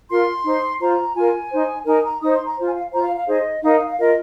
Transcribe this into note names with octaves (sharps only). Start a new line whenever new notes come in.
F4 A#4 C6
D#4 C5
F4 C5 A#5
F4 A#4 G#5
D#4 C5
D#4 A#4 G#5
A#5
D#4 C5 D#6
C6
A#5
F4 C5
G#5
F5
F4 C5 A#5
F5
F5
D#4 G#4 C5 D#5
D#4 A#4 F5
F5
F5
F4 A#4 D#5